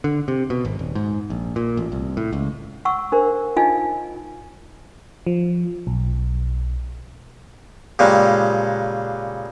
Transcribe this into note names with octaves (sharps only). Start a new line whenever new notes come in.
D3
C3
B2
G#1
D#1
G#2
A#1
A#2
A1
C2
A2
C#2
F#5 C#6 E6
D4 A#4 C5
D4 D#4 F4 D#5 F5 G#5
F3
B1
A#2 C#3 G3 G#3